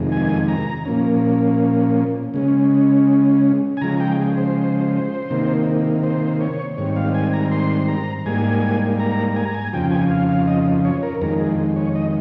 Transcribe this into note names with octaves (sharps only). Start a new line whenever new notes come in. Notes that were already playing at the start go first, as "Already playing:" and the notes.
Already playing: F2 C3 D#3 G#3
G#5
A#5
A#2 F3 A#3 C#4
C#3 G#3 C#4
G#5
C#3 F3 G#3 A#5
G5
G#4
C5
C3 D#3 A#3
C5
C#5
G#2 D#3 G3 C4 C#5
F5
G#5
A#5
C6
A#5
G#2 G3 A#3 G#5
A#5
G#5
A#5
G#5
F2 C#3 F3 G5
G#5
F5
F5
D#5
C#5
A#4
F2 D#3 G#3 A#4
G#4
C#5
D#5